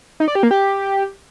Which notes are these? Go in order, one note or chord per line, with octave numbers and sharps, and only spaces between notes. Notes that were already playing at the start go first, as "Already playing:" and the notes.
D#4
D5
G4
A#3
G4